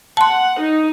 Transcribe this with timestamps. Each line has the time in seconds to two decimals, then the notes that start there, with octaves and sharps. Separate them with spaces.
0.17 F#5 A5 C6
0.59 D#4